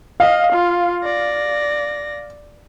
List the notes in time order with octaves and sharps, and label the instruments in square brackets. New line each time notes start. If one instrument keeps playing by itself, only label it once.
[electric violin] D#5 [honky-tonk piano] F5
[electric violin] F4
D5 A#6